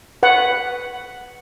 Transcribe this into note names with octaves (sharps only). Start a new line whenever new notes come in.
B4 F#5